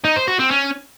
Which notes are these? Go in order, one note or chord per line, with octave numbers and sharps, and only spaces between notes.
D#4
C5
F#4
C4
C#4